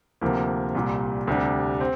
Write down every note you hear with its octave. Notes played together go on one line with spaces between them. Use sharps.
D2 C3 F3 A#3
C2 A#2 G3
D2 C3 G3 D4
C4